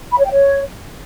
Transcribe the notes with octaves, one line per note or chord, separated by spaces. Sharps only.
B5
C#5
G5
C#5